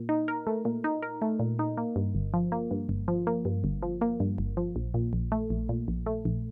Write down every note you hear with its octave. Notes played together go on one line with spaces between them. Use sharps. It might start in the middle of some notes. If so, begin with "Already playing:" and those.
Already playing: A#2
D#4
A#4
A3
A#2
D#4
A#4
A3
A#2
D#4
A#3
G2
G1
F3
A#3
G2
G1
F3
A#3
G2
G1
F3
A#3
G2
G1
F3
A#1
A#2
A#1
A3
A#1
A#2
A#1
A3
A#1